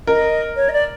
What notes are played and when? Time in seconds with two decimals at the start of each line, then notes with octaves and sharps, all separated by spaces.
0.07 A#4 D#5
0.56 C#5
0.69 D#5
0.73 D5